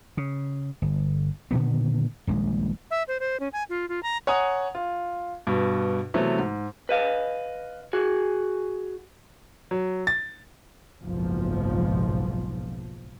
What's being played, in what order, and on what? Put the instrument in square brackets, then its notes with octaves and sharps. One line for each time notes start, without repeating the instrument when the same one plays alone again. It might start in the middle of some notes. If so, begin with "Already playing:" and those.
[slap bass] C#3
G1
A#2 D3 D#3 B3
D#1 A#1 G#3
[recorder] E5
C5
C5
C#4
G#5
F4
F4
A#5
[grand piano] C#5 F#5 G#5 A#5 D#6
F4
G2 B2
C3 E3 F#3 A3 B3
G#2
[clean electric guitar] B4 D#5 F5
F#4 G#4
[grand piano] F#3
A6
[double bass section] F#1 B1 G#2 F3